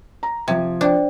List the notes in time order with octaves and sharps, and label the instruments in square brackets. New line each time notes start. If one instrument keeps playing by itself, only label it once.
[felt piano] A#5
[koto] C3 [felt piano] F3 G#6
[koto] D4 [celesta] C5 D5 G5